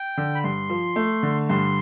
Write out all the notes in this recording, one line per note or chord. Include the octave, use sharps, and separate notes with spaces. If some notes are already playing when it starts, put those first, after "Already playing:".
Already playing: G5
D3
B5
G2 C6
F3
A3
D3
G2 C6